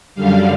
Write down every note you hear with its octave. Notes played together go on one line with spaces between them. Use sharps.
F#2 D3 G3 F5